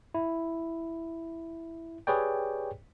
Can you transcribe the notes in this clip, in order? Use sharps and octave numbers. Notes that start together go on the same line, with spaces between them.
E4
G4 G#4 B4 C#5 D5 G5